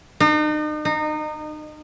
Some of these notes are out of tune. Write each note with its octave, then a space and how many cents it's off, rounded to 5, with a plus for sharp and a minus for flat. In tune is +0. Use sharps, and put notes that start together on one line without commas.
D#4 -40
D#4 -25